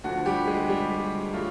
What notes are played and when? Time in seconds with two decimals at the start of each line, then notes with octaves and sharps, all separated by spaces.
0.04 D2 D3 F3 F#4
0.26 G3 G4
0.47 G#3 G#4
0.68 G3 G4
1.33 F#3 A3 F4